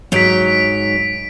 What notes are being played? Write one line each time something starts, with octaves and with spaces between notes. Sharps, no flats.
G#2 F#3 D#4 B6 D7 F7